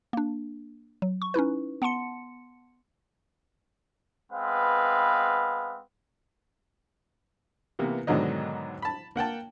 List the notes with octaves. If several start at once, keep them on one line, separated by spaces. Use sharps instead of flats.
A#3 D4
F#3
C#6
C#4 D#4 E4 B4
B3 F#5 A5 C6 C#7
G#3 B3 C4 B4 F5
C3 E3 A#3 B3
G#2 B2 D3 D#3 F#3 D#5
A5 B5
A#3 F#5 G5 A5